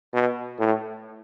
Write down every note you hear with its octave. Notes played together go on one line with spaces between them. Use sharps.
B2
A2